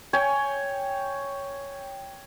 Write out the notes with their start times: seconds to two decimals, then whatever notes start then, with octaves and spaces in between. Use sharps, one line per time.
0.13 C#5 G5 G#5